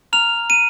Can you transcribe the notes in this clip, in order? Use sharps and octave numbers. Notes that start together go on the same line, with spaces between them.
A#5 F6 F7
D#7